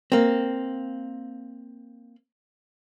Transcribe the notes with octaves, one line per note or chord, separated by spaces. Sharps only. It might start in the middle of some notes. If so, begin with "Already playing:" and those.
A#3 C4